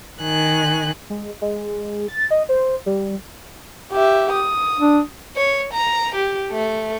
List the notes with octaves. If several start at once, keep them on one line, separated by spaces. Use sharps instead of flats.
D#3 G#5 F#6
G#3
G#3
A6
D#5
C5
G3
G4 E5
D#6
D4
C#5
A#5
G4
A3